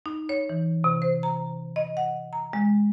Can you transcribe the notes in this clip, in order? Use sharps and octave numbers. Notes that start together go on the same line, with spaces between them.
D#4
C#5
E3
C3
C5
A#5
D#5
F#5
A#5
G#3